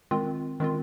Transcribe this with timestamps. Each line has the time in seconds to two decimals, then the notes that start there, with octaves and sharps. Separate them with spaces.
0.11 D#3 G#3 C4 F4
0.60 D#3 G#3 C4 F4